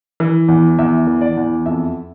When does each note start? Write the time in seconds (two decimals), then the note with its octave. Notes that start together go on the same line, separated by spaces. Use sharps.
0.20 E3
0.48 E2
0.78 E2 E5
1.07 E3
1.21 D5
1.37 E2
1.66 F2 E5